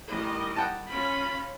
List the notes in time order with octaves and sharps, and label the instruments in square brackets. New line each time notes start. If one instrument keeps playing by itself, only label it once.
[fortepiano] A1 [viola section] D#3 G3 D#5
[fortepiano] F#5 G5 A5
[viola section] C#4 F4 [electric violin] B5